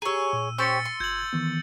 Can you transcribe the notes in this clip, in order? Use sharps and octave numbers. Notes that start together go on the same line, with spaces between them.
G4 G#4 C#5 A#5 E6 D#7
A#2
C#4 G4 C5 E6 A6 C#7
C6
G1 G6 G#6 F#7
D#3 E3 B3